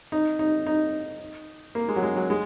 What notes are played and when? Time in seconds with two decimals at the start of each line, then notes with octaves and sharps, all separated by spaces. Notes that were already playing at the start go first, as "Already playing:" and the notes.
0.12 D#4
0.39 D#4
0.67 D#4
1.75 A#3
1.89 G#3
1.96 F#3
2.03 G#3
2.16 F#3
2.30 G#3